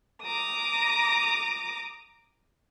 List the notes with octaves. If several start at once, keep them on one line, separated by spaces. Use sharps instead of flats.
A#5 D6 D#6